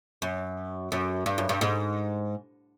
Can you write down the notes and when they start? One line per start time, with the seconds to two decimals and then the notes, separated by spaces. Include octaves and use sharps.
0.22 F#2
0.92 F#2
1.26 G2
1.38 F#2
1.49 G2
1.61 G#2